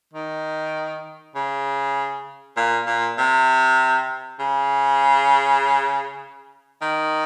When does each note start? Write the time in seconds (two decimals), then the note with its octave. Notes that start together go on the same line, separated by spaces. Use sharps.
0.13 D#3
1.35 C#3
2.57 A#2
2.86 A#2
3.18 C3
4.39 C#3
6.82 D#3